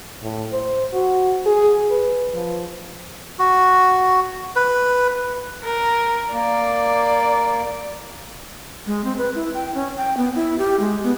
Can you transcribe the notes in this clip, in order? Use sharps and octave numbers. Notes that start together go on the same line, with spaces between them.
A2
C5
F#4
G#4
B4
F3
F#4
B4
A#4
A#3 D5
G#3
C4
B4
E4
G5
C#4
G5
B3
E4
G4
G#3
B3